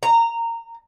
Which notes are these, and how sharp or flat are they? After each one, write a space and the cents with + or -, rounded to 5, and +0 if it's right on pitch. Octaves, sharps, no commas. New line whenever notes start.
A#5 -15